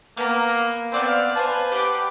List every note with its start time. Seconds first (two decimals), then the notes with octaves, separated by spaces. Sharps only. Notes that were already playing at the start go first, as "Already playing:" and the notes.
0.17 A#3 B3 A#5
0.92 B3 C4 D5 C6
1.08 F5
1.36 B4 C5 G#5 A5
1.72 G4 F#5 D6